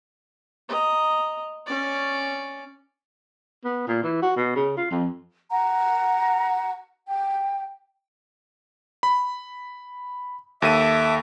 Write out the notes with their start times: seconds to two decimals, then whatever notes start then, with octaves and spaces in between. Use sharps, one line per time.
0.69 D#5 A#5
1.67 C#4 D5
3.65 B3
3.88 A#2
4.03 E3
4.22 F#4
4.37 B2
4.56 C#3
4.77 F4
4.91 F2
5.51 F#5 A#5
7.08 G5
9.03 B5
10.62 D#2 A4 E5 D6 D#7